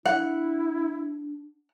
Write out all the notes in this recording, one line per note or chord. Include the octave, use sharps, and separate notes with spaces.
D4 E4 F#5